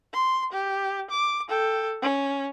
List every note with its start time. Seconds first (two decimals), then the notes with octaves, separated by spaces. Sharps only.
0.14 C6
0.53 G4
1.11 D6
1.48 A4 G5
2.02 C#4